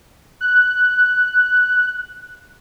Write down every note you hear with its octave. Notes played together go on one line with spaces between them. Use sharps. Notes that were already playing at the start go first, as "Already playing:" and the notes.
F#6